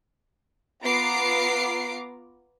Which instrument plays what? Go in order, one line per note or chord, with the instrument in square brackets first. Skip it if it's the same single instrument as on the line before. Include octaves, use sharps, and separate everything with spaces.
[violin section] B3 F4 A#5 D6 C7 D7